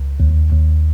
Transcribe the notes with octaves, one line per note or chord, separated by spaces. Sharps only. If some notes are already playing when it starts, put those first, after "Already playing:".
Already playing: C#2
D#2
D#2